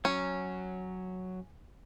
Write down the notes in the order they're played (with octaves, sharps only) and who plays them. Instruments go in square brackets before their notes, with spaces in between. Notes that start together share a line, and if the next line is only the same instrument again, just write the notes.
[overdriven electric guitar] F#3 [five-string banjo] C#4